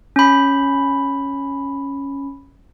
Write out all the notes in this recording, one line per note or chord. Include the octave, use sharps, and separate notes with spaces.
C#4 B5